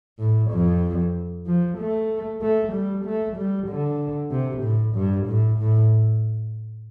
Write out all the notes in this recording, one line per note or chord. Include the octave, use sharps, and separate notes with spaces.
A2
F2
F3
A3
A3
G3
A3
G3
D3
C3
A2
G2
A2
A2